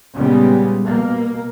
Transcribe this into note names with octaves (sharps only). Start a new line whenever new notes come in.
A#2 C#3 G3 G#3 B3
B2 A#3